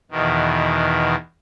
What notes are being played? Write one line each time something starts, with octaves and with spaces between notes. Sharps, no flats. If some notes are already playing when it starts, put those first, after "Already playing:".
E2 B2 D#3